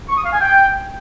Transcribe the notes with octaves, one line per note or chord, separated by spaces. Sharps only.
C#6
D#6
F5
G#5
G5